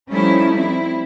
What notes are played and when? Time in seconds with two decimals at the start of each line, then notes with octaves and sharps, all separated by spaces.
0.10 F3 G3 A3 C#4 D#4 E4
0.53 G3 C4 E4